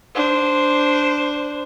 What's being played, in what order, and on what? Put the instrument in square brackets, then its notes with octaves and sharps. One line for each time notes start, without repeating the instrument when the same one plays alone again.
[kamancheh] D4 C5